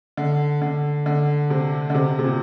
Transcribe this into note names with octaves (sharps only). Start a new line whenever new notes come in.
D3
D3
D3
C3
D3
C3
C3
A#2